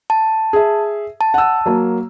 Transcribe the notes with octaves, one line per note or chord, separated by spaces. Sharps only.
A5
G#4 E5
A5
F#5 E6
F#3 A#3